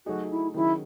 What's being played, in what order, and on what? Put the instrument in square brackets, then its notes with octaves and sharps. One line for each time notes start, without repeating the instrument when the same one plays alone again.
[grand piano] F#3 A3 D#4 G#4 [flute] F#4
[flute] E4
[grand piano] D#3 F#3 C#4 G#4 [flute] E4